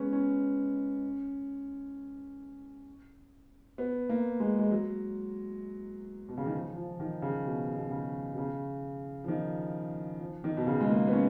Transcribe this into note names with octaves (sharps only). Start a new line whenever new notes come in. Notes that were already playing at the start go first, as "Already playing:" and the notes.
Already playing: G#3 B3 C#4
C#4
B3
A#3
G#3
G#3
F#3
B2
C#3
D#3
F3
F3
D#3
C#3
B2
B2
C#3
B2
C#3
F3
D#3
F3
D#3
B2
C#3
G#3
A#3
B3
C#4